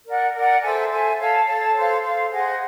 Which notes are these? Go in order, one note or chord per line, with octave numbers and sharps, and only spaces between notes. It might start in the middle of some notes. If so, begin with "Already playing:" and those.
A#4 D5 F#5
A#4 D5 F#5
A4 C5 E5 G#5
A4 C5 E5 G#5
A4 C#5 F5 A5
A4 C#5 F5 A5
A4 C5 F5
A4 C5 F5
G#4 C5 D#5 F#5